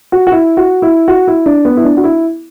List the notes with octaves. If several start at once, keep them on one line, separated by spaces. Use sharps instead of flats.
F#4
F#4
E4
F#4
E4
F#4
E4
D4
B3
E4
D4
F#4
E4